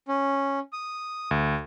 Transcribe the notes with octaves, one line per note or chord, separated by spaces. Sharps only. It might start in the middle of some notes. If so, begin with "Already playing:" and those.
C#4
D#6
D2